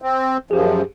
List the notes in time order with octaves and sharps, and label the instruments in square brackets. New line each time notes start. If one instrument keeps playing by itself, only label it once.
[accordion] C4
[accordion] F#2 F3 [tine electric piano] G4 G#4